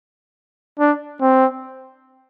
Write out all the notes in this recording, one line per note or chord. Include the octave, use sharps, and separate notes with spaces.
D4
C4